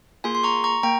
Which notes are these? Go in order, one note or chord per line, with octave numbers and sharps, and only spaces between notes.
A#3 F4 G#4 G#5 C6
C6
A#5 C#6
A#5 C#6
A#3 G5 A#5